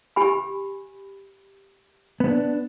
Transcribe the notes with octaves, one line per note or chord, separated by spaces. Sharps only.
G4 G#5 B5
B3 D4